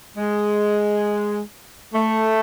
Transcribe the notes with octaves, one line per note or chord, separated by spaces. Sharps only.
G#3
A3